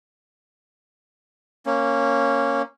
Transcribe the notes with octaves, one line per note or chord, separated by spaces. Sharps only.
A#3 C#4